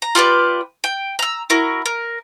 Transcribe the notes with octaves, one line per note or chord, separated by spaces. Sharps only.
A#5
F4 G4 B4 D5
G5
A#5 E6
E4 F#4 A#4
A#4